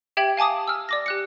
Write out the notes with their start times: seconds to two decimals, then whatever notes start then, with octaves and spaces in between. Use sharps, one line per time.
0.17 G4 E5 G5 G#6 F#7
0.37 F5 G#5 A5 D6 D#6
0.67 E6 F6
0.89 D5 D6 A#6
1.06 G4 F#6 C#7